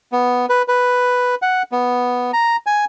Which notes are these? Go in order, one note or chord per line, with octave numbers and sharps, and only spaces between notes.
B3
B4
B4
F#5
B3
A#5
G#5